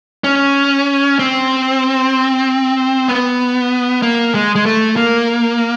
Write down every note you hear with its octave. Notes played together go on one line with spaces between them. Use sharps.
C#4
C4
B3
A#3
G#3
G#3
A3
A#3